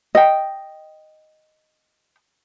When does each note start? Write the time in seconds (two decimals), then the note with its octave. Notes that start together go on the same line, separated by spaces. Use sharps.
0.15 D#5 G5